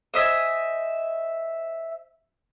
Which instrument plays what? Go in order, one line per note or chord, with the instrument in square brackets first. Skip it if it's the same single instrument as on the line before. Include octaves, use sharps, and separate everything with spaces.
[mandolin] C5 D#5 E5 G#5